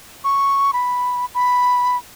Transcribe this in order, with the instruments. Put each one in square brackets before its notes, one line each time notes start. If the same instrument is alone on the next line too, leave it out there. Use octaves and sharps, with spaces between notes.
[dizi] C#6
B5
B5